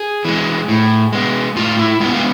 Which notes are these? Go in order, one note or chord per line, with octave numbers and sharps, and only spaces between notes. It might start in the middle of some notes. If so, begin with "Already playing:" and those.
Already playing: G#4
E3 G#3
A2
G#3 B3
A2 F4
E4
G#3 B3 F4
F4